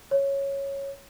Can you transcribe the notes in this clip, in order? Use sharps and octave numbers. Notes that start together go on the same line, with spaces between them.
C#5